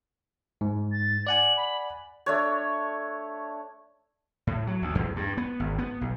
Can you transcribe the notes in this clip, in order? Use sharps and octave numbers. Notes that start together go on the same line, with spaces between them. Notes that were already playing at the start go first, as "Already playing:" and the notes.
G#2
A6
D5 F#5 G#5 F#7
B5
A3 D4 C#5
A2
F#3
D2
E2
G2
B3
G#1
B3
B1